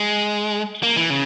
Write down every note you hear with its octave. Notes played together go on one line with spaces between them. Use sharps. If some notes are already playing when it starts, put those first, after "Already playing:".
Already playing: G#3
A#3
E3
C#3